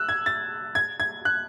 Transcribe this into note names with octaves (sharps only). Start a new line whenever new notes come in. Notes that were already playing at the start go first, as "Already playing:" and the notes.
Already playing: E6 F#6
G#6
A6
G#6
G#6
F#6